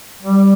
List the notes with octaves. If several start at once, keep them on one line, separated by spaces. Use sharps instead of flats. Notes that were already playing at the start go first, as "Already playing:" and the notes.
G3